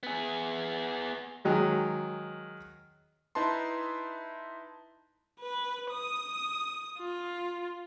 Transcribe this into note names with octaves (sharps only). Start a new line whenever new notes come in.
B3 G#4
D#3 F#3 G#3
D#4 E4 B4 A5 C6
B4
D#6
F4